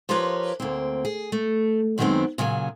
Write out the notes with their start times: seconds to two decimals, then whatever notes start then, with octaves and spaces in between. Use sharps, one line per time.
0.09 F3 F4 G4 A#4 B4 C#5
0.60 D2 A#3 C4
1.05 G#4
1.32 A3
1.98 F#2 D#3 F#3 G#3 B3 C4
2.38 A#2 C#3 F#3 C#5 G#5